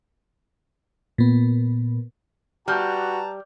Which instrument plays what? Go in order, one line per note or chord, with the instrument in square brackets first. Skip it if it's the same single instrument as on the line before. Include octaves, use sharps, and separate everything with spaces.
[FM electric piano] A#2 B3
[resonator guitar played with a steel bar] G3 [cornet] F#4 [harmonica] B4 A5 A#5 [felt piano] F6 G6